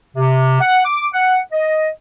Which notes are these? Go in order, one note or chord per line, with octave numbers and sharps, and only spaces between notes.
C3
F#5
D6
F#5
D#5